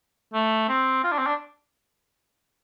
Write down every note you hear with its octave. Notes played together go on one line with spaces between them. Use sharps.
A3
C4
F4
D4
C4
D4